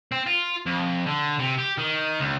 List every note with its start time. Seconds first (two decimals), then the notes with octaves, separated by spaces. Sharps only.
0.12 C4
0.27 F4
0.66 F2
1.06 D3
1.39 C3
1.58 G4
1.78 D#3
2.20 C#2